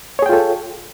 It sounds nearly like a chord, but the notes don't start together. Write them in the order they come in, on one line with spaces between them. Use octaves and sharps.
C#5 G#4 G5 F4 A4